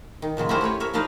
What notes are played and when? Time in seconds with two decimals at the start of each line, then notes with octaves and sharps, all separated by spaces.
0.22 D#3
0.37 A#2 C#3 F#3 G#3
0.49 E4 F#4 G4 A4 A#4 C5
0.61 A3 C#4 B4 C#5
0.80 A#4 C#5 E5
0.94 F3 D4 D#4 A#4 B4 F5